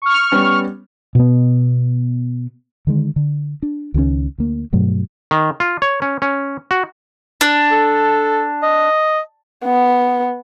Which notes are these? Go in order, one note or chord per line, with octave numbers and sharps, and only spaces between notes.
C#6 F6
G3 B3 C#4
B2 B3
D3 D#3 G#3
D3
D4
C#2 D#3 E3 C#4
D2 A#3
G2 B2 F#3 A3
D#3
F4
C#5
C#4
C#4
F#4
D4
A4
D#5
B3